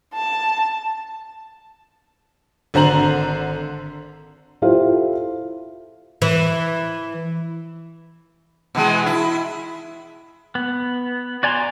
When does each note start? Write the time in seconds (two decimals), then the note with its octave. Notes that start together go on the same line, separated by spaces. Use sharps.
0.14 A5
2.74 G#1 D3 C5 A#5 F#7
4.62 E4 F4 G4 A4 C5 F5
6.22 E3
8.75 B2 E3 G#3
9.06 E4
10.55 B3
11.43 F#4 D5 G#5 A#5 C6